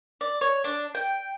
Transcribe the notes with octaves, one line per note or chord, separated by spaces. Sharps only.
D5
C#5
D4
G5